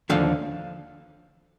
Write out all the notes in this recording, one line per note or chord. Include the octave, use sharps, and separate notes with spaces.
D#2 D3 F3 F5